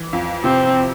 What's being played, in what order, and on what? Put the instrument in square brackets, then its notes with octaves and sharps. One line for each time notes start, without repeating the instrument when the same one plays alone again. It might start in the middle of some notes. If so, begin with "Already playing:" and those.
Already playing: [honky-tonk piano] E3
F2
[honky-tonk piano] C3 [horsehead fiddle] C4